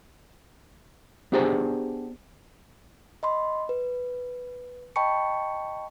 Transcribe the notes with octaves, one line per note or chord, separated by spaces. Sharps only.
B3 D4 G4 G#4 C5 A#5
D#5 B5 C6
B4
D#5 G5 A5 B5 C#6 C#7